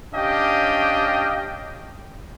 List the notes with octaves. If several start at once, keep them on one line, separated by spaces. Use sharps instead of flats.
C#4 D4 G4 D#5 F5 G5